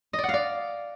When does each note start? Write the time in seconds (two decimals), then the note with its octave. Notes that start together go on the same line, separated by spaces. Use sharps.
0.13 D#5
0.18 D5
0.24 F#5
0.29 F5
0.34 D5